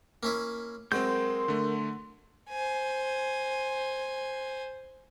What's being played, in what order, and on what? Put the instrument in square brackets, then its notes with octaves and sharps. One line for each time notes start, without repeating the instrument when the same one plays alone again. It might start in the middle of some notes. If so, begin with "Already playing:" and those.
[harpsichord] A#3 C#4 E4
[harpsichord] F#3 [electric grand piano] G#3 C4 [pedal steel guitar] A#4 G6 [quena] C6
[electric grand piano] D3 A3
[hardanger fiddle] C5 G#5